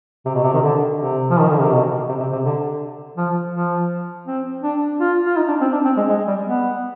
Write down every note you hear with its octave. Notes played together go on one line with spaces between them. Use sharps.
C3
B2
C3
D#3
D3
C3
F3
D#3
D3
C3
B2
C3
C3
C3
D3
F3
F3
C4
D4
F4
F4
D#4
D4
C4
D4
C4
G#3
G#3
G3
B3